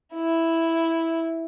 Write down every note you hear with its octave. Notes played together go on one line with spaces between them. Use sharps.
E4